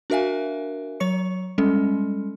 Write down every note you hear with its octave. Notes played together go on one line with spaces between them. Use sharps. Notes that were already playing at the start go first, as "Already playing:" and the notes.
D4 F#4 A#4 E5 F5 G#5
F#3 C#5 C#6 C#7
G3 G#3 C#4 A4